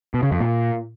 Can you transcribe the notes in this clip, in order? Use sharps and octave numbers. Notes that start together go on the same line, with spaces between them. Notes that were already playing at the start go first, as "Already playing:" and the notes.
B2
C#3
F2
A#2